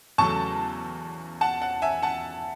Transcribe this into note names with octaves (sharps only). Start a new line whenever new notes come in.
E2 C#3 F#3 A3 A5 C#6
F#5 A5
F#5
E5 G#5
F#5 A5